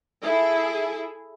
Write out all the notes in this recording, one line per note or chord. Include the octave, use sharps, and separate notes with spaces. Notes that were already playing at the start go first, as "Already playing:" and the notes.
E4 G#4 A4